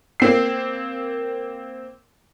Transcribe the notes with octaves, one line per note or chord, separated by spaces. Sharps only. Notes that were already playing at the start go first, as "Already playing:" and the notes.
A#3 C4 C7